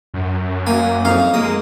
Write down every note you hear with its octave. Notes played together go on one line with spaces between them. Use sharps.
F#2
A#3 G#5
F2 D#4 F5
G#3 A#3 D#6